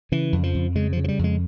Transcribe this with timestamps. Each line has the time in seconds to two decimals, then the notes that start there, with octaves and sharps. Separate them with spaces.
0.12 C#3 E3
0.33 F2
0.43 F3
0.55 F2
0.76 C#3 G#3
0.93 F3
0.97 C#3
1.04 F3
1.08 G3
1.19 F2
1.24 G#3